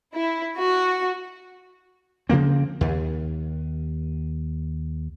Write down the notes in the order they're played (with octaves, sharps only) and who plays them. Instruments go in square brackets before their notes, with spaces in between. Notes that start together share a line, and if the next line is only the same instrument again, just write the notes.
[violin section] E4
F#4
[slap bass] C#3 F3 A#3 C4
D#2